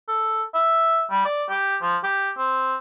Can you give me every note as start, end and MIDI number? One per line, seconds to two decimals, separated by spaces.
0.08 0.43 69
0.54 1.06 76
1.11 1.22 55
1.25 1.44 74
1.50 1.77 67
1.82 1.97 53
2.03 2.30 67
2.38 2.76 60